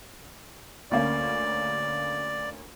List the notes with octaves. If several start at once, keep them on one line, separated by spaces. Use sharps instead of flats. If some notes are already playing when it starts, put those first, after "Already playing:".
D2 A#3 C#4 D5